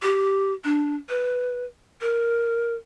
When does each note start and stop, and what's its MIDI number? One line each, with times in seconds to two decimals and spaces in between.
0.03 0.53 67
0.64 0.95 62
1.09 1.65 71
2.01 2.74 70